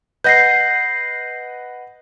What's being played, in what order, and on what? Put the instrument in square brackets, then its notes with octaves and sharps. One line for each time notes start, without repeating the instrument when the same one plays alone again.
[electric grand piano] B4 D#5 F#5 [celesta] G6 A#6 C7